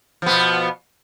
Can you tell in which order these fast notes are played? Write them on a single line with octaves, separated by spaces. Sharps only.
F3 B3 B2